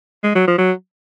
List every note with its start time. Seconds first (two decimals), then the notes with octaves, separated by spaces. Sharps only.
0.24 G#3
0.35 F#3
0.47 F3
0.58 F#3